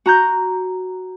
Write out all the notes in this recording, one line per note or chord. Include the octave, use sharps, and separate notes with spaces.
F#4 A#5 G6